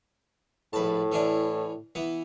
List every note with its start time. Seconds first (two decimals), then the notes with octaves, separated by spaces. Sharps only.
0.73 A#1 A2 B4 A5
1.12 E3 C#4 D4
1.95 E3 B3